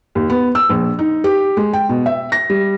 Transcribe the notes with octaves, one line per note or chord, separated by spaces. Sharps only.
D#2
B3
E6
A#1
D#4
G4
G#3
G5
B2
E5
A#6
G3